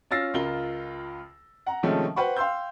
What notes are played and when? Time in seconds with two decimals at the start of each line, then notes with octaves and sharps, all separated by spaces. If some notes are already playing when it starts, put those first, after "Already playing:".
0.11 C#4 F4 E6 A6 A#6 C7
0.34 C#2 F4 A#4 G7
1.66 F#5 A#5
1.83 C3 D#3 F3 G#3 A3 C#4
2.16 B4 C5 F#5 G5 B5 C#6
2.36 F5 G5 C6 E6 G6